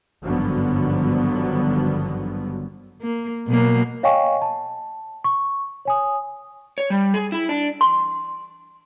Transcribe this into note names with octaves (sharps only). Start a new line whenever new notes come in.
G#1 G2 D3 F3 F#3 B3
A#3
B2 F#3 A#3
C#5 D#5 F5 G5 G#5 C#6
A5
C#6
C#5 G#5 D#6
C#5
G3
G#4
E4
D4
C6